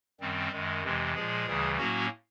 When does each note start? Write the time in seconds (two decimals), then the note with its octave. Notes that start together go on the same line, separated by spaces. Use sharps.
0.20 F#2 D#3 G3 C4
0.51 F#2 D#3 G#3
0.82 F2 C3 E3 G#3
1.14 A#2 F3 G#3 G#4
1.46 D2 C#3 E3 G3
1.77 A2 F#3 A#3 C#4 F#4